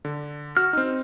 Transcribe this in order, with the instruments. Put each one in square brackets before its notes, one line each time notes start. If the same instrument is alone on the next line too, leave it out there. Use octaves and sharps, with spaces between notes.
[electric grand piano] D3
[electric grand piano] F#4 [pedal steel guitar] F6
[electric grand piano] C4 D#4